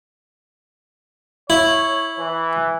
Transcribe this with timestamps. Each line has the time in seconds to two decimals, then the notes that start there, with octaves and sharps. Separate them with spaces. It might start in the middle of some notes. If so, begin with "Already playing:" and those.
1.50 E4 C#5
2.19 E3